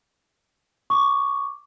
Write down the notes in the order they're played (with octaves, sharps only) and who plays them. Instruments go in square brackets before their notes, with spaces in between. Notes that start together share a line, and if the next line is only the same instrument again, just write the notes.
[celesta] C#6 D6